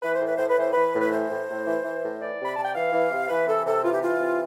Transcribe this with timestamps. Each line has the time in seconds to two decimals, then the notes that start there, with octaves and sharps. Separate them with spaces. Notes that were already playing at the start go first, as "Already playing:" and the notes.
0.02 E3 B4
0.14 C5
0.21 A2 B4
0.36 A2 C5
0.48 B4
0.57 E3 C5
0.70 B4
0.76 E3
0.94 A2
0.99 B4
1.11 E3 C5
1.29 A2
1.48 A2
1.66 E3
1.83 E3
2.02 A2
2.19 E3 D5
2.39 C3
2.45 B5
2.56 C3 A5
2.65 G5
2.74 E3 F5
2.92 E3
3.10 C3
3.29 E3 B4
3.46 C3 A4
3.65 C3 A4
3.83 E3 F4
3.92 G4
4.01 E3 F4
4.20 C3